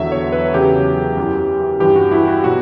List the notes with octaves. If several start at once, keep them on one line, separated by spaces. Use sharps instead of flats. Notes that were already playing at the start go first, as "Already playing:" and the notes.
Already playing: E2 D3 F#3 E5
C#5
B4
E2 C#3 F#3 G4
F#2 E3
G2 E3 G4
F#4
E4
F#4
B2 F#3 F#4